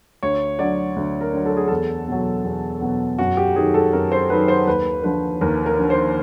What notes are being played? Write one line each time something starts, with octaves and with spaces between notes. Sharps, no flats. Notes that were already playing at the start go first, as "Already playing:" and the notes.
D2 C#5
D3 F#3 D5
D2
A#4
D3 F#3
A4
G#4
E2 A4
B2 F#3
E2
B2 F#3
F#2 F#4
G4
D#3 F#3 G#4
A4
F#2 A#4
C5
D#3 F#3 B4
C5
D#2 B4
D3 F3 B4
D#2 A#4
A#4
D3 F3
C5